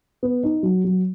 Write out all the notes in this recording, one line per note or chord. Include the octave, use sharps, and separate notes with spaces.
B3
D#4
F#3
F#3